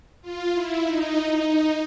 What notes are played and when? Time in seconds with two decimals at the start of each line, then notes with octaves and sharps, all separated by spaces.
0.22 F4
0.53 E4
0.84 D#4
1.31 D#4